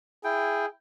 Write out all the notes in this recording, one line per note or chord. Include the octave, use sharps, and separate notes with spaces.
E4 G#4 G5